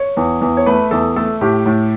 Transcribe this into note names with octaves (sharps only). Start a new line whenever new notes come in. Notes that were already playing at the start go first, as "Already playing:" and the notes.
Already playing: C#5
E2
E2
C#5
A3 B4
E2 A4
A3 A4
A2 G4
A2